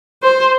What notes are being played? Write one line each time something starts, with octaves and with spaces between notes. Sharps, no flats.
C5